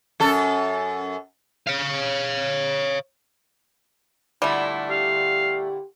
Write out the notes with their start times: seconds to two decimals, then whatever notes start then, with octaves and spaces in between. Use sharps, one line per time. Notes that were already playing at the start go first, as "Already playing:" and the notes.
0.20 F#2 A4
1.67 C#5 F5
4.42 A#2 D3 G3 A3 E4
4.91 G4 F5